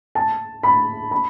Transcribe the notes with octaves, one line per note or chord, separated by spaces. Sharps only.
A5
B5
B5